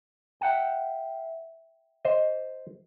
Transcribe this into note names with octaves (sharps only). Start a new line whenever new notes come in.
E5 F#5 G5
C5 D#5